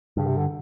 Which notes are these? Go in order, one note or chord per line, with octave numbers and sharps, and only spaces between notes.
G2 C#3
C3
D3